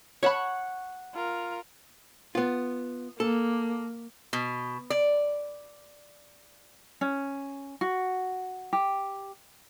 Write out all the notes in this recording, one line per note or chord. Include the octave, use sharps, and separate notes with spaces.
C#5 F#5 A5 B5 C#6
F4 A#4
B3 F4
A#3 A4
B2
D5
C#4
F#4
G4